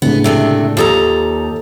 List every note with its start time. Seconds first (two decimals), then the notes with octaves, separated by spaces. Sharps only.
0.02 C#2 A2 D3 B3
0.24 C3 A3 D4
0.77 D#2 F4 G4 A4 A#5 D#6